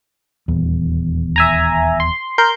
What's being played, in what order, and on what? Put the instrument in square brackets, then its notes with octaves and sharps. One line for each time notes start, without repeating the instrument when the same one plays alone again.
[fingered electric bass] D#1 E2
[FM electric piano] E5 G#5 A#5
C6
A#4 C6 G6